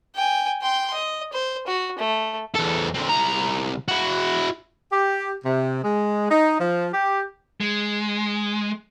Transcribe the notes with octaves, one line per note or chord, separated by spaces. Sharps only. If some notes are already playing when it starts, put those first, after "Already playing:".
G5 G#5
G5 C6
D#5
C5
F#4
A3
E2 A4
D3 C4
C2 A#5
E4 F#4
G4
C3
G#3
D#4
F3
G4
G#3